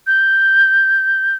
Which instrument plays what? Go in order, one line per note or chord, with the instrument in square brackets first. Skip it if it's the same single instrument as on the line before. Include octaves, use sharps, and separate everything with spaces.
[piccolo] G6